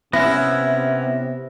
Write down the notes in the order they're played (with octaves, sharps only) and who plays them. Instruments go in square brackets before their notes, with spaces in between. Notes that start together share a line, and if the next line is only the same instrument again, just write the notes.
[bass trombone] C3 [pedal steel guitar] B3 C#4 [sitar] E4 [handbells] A#6